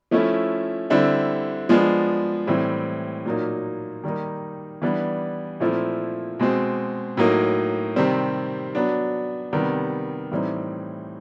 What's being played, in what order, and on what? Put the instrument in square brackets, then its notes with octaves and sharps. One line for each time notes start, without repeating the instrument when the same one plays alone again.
[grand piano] F3 A3 C#4 E4
D3 G3 C4 E4
F3 G#3 B3 D4
A2 E3 G3 C4
A#2 F#3 A#3 D#4
D#3 G3 A#3 D#4
E3 G3 B3 D4
A#2 F3 A3 C4 E4
B2 G#3 C4
A2 F#3 A#3 D#4
C3 D#3 G3 C4
F#3 B3 D4
C3 D#3 G3 B3
A2 E3 G3 C4 D#4